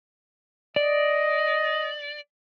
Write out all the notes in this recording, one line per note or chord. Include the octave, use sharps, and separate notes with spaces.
D5 D#5